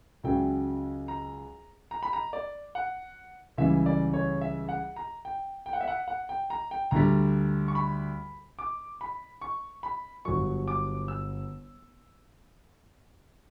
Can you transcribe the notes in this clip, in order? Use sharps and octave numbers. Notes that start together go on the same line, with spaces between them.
C#2 C#3 F#3 G5
A#5
A#5
B5
A#5
D5
F#5
C#2 C#3 E3 G3 E5
D5
C#5
E5
F#5
A#5
G5
G5
F#5
E5
F#5
F#5
G5
A#5
G5
D2 D3 G3 A#5
C#6
B5
D6
B5
C#6
B5
G1 G2 F#3 C#6
D6
E6